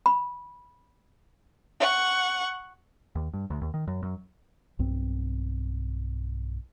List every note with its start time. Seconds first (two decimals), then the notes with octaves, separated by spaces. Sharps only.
0.06 B5
1.80 F#5 C#6
3.15 D#2
3.34 G2
3.50 D2
3.62 D#2
3.74 D#3
3.87 F#2
4.03 F#2
4.79 B1 G2 C4